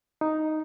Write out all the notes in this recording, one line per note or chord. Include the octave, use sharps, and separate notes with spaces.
D#4